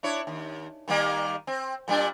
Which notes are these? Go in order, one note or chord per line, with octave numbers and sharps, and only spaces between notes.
D4 E4 C#5
D#2
D#3 G3 A#3
C4
A#2 G3 D4